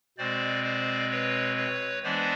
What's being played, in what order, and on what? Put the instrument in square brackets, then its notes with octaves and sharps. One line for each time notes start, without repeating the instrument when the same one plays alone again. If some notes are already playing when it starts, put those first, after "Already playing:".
[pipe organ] B2 G#3 C4 C5 D5
C5 D5
B4 C#5
B4 C#5
E3 G#3 B3 D4 C5 D5